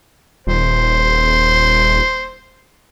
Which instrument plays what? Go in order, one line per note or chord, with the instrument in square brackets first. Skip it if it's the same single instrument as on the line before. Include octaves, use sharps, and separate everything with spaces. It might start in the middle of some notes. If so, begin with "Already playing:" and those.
[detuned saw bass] D#1 [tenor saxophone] C5